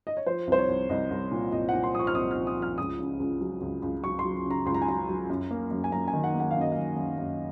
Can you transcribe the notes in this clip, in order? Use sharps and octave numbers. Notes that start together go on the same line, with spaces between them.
D#5
C#5
F3 C5
C2 C5
C#5
C2
C2 D#5
C2
A#2
C2 D#5
A#2 F#5
C6
F3 C#6 D#6
F6
C2 D#6
F3 F6
D#6
F3
F6
C#2 D#6
C#3
C#2
F#3
C#2
C#2
F#3 C#6
C6
F#3
C#3 A#5
C#2 C6
A#5
G#5
F#3 A#5
F#3
F#2
A#3
F#2
G#5
F#2 A#5
G#5
D#3
F#5
A#3
F#5
F#2 F5
D#5
F#2 F5
F#2
F#2